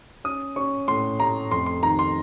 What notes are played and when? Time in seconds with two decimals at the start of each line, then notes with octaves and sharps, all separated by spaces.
0.24 C#4 D#6
0.56 C#4 C#6
0.88 A2 C6
1.20 A3 A#5
1.51 F2 C6
1.66 C6
1.83 D#3 A#5
1.99 C6